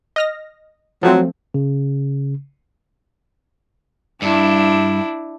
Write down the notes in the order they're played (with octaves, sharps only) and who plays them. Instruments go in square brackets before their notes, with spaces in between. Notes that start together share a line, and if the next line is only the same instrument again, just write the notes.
[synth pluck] D#5 F6 A#6
[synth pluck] F3 A3 C4 [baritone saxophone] F#3
[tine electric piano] C#3
[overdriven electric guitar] G2 [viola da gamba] D4 E4